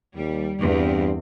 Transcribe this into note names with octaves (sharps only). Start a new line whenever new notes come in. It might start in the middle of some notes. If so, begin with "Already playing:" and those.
D#2 G3
E2 G2 C4